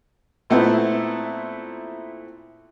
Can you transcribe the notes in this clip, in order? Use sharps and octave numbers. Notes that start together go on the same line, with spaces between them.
A#2 A3 B3 C4 E4